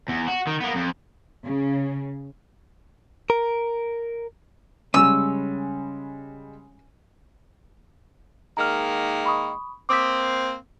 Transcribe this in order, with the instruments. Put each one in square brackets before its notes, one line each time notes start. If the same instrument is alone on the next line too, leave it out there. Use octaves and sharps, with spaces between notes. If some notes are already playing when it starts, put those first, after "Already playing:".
[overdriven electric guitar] E2
F#4
D#3
A#3 B3
F2
[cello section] C#3
[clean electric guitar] A#4
[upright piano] C#3 G3 G#3 [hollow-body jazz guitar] C#4 [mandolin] E6
[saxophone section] D#3 G#3 A#3 [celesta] A#5 F6
[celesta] B5 C#6 D#6
[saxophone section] A#3 C4 [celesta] D6 D#6 B6